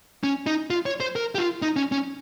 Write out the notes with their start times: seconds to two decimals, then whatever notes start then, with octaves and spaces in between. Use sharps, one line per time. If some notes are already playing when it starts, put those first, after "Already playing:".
0.24 C#4
0.46 D#4
0.70 F4
0.86 C#5
1.00 C5
1.16 A#4
1.35 G4
1.38 F4
1.62 D#4
1.76 C#4
1.92 C#4